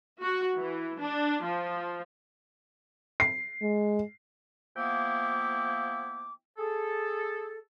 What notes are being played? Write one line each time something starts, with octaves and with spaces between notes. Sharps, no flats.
F#4
E3
D4
F3
C7
G#3
F3 A#3 B3 E4 G5 D6
G#4 A4